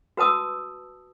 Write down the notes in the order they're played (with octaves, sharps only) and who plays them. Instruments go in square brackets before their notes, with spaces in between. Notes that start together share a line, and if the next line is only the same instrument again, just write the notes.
[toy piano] F#4 B4 A5 D#6 E6